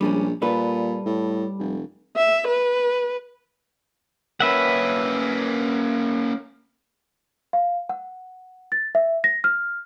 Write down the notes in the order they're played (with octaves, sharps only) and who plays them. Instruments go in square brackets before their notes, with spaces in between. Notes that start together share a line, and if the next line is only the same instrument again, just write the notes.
[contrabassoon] A#1 [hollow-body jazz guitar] G3 G#3 C#4
[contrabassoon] A#2 [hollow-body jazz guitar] G3 A4 B4
[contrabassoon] A2
F1
[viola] E5
B4
[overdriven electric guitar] A#3 C#4 [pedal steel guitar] B4 E5 F#5
[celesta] F5
F#5
A6
E5
A#6
F6